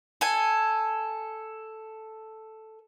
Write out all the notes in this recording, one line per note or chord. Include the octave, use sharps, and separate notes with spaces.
A4 G#5